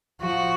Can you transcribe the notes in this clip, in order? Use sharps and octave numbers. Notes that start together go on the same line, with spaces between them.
F3 F#4